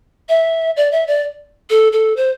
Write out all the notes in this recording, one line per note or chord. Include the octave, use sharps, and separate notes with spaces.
E5
D5
E5
D5
A4
A4
C5